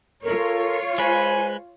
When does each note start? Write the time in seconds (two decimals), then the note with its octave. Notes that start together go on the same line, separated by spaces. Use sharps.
0.23 F4 A4 A#4 C#5
0.98 G#3 B4 C5 G#5